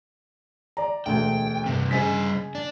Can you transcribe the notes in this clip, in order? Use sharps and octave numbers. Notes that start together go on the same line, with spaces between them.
D5 A#5
E1 D2 G5
G2 C3
C#3 G3 C5 D#5 G#5 B6
D4